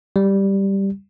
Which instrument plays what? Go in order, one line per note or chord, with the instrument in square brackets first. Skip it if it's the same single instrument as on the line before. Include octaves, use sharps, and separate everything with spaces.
[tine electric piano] G3